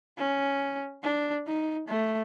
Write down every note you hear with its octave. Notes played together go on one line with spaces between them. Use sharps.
C#4
D4
D#4
A3